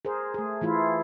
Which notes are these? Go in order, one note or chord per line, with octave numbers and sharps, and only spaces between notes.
G#4 A#4 C5
A3 G#4
E3 A3 E4 F4